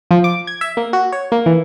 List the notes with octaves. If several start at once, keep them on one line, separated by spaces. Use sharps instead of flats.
F3
D6
G#6
E5
A#3
F#4
C#5
A#3
E3